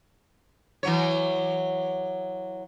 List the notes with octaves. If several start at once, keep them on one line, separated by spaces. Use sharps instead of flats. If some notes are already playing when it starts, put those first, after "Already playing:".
E3 F#3 C#5